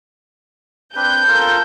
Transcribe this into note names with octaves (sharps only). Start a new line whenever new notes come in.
C4 D4 B4 G6
F4 A4 A#4